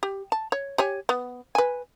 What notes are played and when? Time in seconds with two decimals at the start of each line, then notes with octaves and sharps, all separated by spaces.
0.03 G4
0.32 A5
0.52 C#5
0.78 G4 C#5 G#5
1.09 B3
1.55 B4 G#5